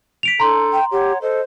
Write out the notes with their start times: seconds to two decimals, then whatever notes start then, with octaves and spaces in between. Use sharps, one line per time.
0.23 B6 D7 F7
0.40 D4 A4 A#5 C6 G6
0.73 G5
0.92 G4 C#5 F#5
1.22 A4 C5 D#5